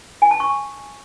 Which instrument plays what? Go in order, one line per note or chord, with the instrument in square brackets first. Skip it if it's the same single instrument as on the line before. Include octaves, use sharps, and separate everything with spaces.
[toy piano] G#5
A5
C#6